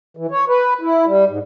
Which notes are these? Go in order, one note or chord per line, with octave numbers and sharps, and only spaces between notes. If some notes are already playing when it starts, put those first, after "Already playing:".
E3
C#5
B4
E4
G3
G#2